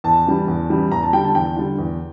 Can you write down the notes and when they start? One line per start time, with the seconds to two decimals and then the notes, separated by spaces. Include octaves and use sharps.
0.04 E2 A5
0.26 C#3 E3 G3
0.48 E2
0.70 C#3 E3 G3
0.91 E2 A#5
1.03 A5
1.13 D3 G3 G5
1.24 A5
1.35 E2 G5
1.56 D3 G3
1.78 E2